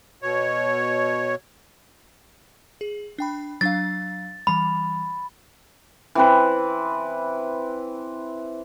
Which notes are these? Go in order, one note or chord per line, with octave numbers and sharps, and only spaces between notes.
B2 C#5
G#4
D4 G5 B5
F#3 D4 F5 A6
E3 G3 B5
E3 C4 B4